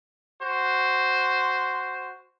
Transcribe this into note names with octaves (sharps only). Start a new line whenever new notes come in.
F#4 C5